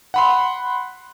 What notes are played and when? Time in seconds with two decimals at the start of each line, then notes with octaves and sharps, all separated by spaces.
0.14 F#5 B5 C6